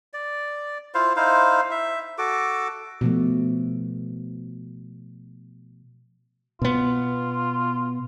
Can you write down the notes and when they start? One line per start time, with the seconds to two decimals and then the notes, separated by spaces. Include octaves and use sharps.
0.13 D5
0.94 E4 F4 C5 F5
1.16 D#4 E4 C5 F5
1.71 E5
2.18 F#4 A4 D6
3.01 B2 F3 A3
6.62 B2 B3 F4